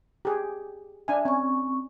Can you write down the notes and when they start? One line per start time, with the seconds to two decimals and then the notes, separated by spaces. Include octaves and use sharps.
0.25 G4 G#4
1.08 D4 E5 G#5
1.25 C4 C#4 C#6